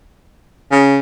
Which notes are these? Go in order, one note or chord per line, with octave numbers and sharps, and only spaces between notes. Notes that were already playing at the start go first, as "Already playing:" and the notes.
C#3